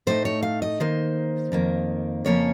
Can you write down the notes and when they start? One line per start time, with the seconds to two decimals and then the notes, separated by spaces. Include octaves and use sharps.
0.07 A2 A3 D#4 C5
0.25 C#5
0.43 F5
0.62 D#5
0.80 D#3 A#3 D#4 C5
1.52 F2 D#3 A#3
2.25 F2 C#3 F3 A#3 C#4 C#5